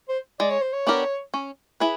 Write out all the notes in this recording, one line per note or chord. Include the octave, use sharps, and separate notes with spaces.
C5
G#3 D5
C#5
C5
C#5
B3 D4 G4 A#4
C#4
E4 G#4 B4